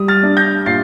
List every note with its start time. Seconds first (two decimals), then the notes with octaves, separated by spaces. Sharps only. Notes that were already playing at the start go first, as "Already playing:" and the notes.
Already playing: G3 D#6
0.08 F6 A6
0.23 D4
0.37 G6 A#6
0.66 A#2 A6 C7